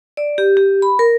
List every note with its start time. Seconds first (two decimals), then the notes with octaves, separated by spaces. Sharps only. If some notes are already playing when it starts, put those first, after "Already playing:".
0.17 D5
0.38 G4
0.57 G4
0.82 B5
0.99 A#4